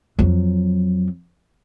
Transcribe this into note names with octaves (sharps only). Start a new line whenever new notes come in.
F2 F#3